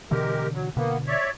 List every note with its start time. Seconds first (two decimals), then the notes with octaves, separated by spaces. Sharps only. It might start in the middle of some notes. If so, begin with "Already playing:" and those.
0.11 B2 D3 E3 G#3 G4 A#4
0.54 F#3
0.77 B2 D3 A#3 B3
1.07 C#5 D5 E5